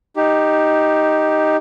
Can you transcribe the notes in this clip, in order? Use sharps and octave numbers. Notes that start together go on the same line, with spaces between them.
D#4 G4